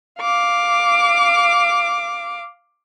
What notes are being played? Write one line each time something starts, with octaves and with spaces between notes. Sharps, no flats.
F5 D6